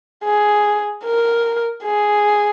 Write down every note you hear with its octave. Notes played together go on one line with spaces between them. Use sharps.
G#4
A#4
G#4